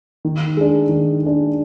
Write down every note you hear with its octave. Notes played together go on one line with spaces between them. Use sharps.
D#3
G#3 D4
D#3
G#3 D4